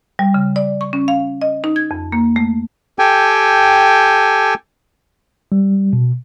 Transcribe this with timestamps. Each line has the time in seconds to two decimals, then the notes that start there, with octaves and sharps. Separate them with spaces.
0.19 G3
0.34 C#3
0.56 D5
0.81 C#6
0.93 C#4
1.08 F5
1.42 D#5
1.64 D#4
1.76 G#6
1.91 F2
2.12 A#3
2.36 A3
2.99 G4 A4 G5 G#5
5.52 G3
5.93 B2